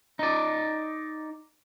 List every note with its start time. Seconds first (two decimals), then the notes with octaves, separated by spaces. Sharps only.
0.19 D#4 D5